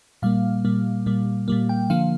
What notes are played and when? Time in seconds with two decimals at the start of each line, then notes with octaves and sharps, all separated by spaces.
0.22 A#2 G3 A#3 F5
0.65 A#2 G3 A#3
1.06 A#2 G3 A#3
1.48 A#2 G3 A#3
1.69 G5
1.90 D3 F3 A#3 F5